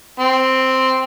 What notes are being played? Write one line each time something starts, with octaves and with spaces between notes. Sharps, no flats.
C4